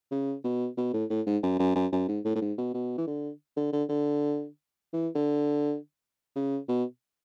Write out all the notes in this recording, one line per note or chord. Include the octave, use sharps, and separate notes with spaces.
C#3
B2
B2
A2
A2
G#2
F#2
F#2
F#2
F#2
G#2
A2
A2
G#2
B2
B2
E3
D3
D3
D3
D3
E3
D3
C#3
B2